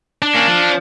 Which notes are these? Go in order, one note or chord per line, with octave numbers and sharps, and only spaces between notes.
D4
A#3 C#4
F3